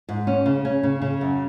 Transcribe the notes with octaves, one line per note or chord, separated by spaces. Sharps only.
G#2
C#4
C#3
C#4
C#3
C#3
F#2